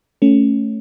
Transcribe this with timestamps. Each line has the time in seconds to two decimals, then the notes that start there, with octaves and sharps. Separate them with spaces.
0.22 A3 C#4